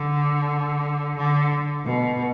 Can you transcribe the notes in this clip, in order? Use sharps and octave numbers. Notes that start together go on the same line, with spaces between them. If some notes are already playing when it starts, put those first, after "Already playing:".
Already playing: D3
D3
B2